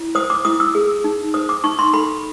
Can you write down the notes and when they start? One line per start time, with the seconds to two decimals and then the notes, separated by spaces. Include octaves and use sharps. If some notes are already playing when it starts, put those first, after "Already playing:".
Already playing: E4
0.15 C5 D#6
0.30 D6
0.45 E4 D#6
0.60 E6
0.75 G#4
1.04 D#4
1.34 C5 D#6
1.49 D6
1.64 D#4 C#6
1.79 C6
1.94 A4 B5